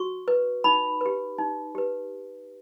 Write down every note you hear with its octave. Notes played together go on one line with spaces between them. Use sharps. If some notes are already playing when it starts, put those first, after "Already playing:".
Already playing: F#4 C#6
B4
D#4 B5
G4 B4
D#4
G4 B4